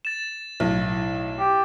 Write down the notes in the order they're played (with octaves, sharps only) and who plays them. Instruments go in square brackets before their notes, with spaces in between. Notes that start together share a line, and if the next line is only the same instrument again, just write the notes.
[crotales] A6 E7
[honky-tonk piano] B1 A2
[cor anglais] G4